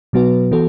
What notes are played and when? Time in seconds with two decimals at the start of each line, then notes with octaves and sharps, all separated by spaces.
0.13 B2 F#3 B3 F#4 B4
0.51 E3 B3 F#4 A4